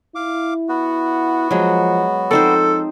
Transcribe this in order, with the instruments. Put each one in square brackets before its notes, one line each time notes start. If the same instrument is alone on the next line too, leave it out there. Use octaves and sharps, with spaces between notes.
[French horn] E4 [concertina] F5 D6
[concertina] B3 F#4
[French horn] F3 [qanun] F#3 G#3
[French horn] F3 [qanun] C4 D#4 C5 [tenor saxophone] A4